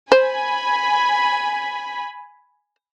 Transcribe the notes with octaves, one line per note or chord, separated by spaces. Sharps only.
C5 G#5 B5